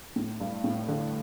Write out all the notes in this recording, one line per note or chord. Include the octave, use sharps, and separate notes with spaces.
A2
G2
A2
D3